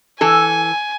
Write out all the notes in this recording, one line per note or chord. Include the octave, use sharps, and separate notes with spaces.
E3 A4 G#5